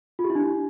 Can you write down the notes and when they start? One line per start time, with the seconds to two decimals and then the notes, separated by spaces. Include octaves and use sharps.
0.19 F4
0.24 G4
0.30 E4
0.35 D4